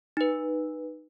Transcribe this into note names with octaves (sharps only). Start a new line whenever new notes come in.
D#4 B4